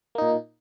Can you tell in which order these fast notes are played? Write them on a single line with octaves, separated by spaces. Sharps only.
A#3 D#4 A#2